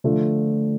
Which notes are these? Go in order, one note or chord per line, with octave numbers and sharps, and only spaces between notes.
D3 F3 A3 F4